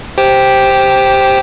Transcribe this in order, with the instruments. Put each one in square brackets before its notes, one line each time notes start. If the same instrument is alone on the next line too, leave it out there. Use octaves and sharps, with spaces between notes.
[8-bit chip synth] G4 C5 G5